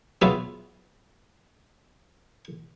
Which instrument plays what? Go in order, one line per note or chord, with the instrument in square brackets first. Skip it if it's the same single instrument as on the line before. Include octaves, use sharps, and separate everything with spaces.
[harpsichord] F#3 B3 F4 F#4 G#4 E5